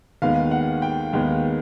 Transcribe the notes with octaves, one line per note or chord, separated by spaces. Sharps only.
D#2 D#3 G#3 B3 F5
F#5
G5
D#2 D#3 G#3 B3